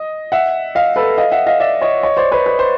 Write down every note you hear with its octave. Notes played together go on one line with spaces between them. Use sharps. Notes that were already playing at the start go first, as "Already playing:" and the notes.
Already playing: D#5
E5 F#5
D#5 F5
A4 B4
D#5 F5
E5 F#5
D#5 F5
D5 E5
C#5 D#5
C#5 D#5
C5 D5
B4 C#5
B4
C5